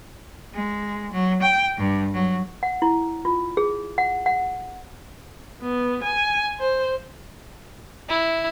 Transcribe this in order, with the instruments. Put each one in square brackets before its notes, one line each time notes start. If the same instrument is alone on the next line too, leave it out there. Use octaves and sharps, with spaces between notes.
[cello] G#3
F#3
G5
G2
F#3
[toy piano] F#5
E4
F4
G#4
F#5
F#5
[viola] B3
G#5
C5
[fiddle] E4